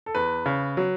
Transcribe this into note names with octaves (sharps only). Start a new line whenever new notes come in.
A4
E2 B4
C#3
F#3